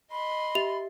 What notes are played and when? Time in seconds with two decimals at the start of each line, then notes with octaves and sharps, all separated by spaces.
0.11 D#5 B5 C6
0.55 G4 E5 F7